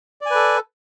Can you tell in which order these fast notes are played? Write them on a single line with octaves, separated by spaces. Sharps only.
D5 G#5 B4 A4